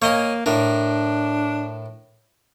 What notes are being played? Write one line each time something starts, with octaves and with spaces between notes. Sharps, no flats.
A#3 C#5 D#5 G#5
A2 D4 A#4